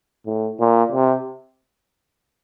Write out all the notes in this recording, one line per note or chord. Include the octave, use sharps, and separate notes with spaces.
A2
A#2
C3